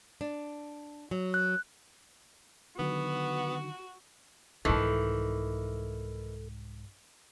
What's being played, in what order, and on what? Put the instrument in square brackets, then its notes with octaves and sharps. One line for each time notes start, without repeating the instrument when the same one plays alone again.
[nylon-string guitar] D4
F#3
[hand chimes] F#6
[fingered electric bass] D3 D#3 F#3 [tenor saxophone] B3 [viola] F#4
[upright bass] C2 G#2 [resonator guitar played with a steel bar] D#3 E3 [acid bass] A4